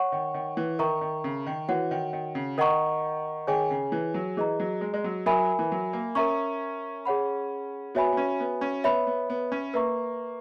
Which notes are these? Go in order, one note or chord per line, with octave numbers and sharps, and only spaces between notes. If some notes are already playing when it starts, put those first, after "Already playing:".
Already playing: C#5 F#5 C#6
D#3
D#3
E3
D#3 A#4 E5 A#5 C#6
D#3
C#3
D#3
E3 F#4 C#5 F#5
D#3
D#3
C#3
D#3 A#4 D#5 F#5 A#5 C#6
D#3 G#4 C#5 G#5
C#3
E3
F#3
E3 G#4 D#5 A#5
F#3
G#3
G#3
F#3
F#3 A#4 E5 G#5 B5
E3
F#3
A#3
C#4 A#4 E5 A#5 C#6
G#4 C#5 F#5 B5
B3 F#4 C#5 E5 G#5 B5
B3
C#4
B3
C#4
B3 C#5 E5 B5
B3
B3
C#4
A#3 B4 E5 A#5 C#6